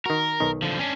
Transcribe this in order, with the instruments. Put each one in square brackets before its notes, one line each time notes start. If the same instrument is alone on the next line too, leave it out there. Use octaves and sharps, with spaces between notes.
[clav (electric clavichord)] D#3 F#4 [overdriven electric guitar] A#4
[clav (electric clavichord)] B1 D#3
[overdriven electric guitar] D3 F3
C#4 D4